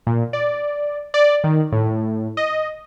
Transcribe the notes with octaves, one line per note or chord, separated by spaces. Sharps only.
A#2
D5
D5
D#3
A2
D#5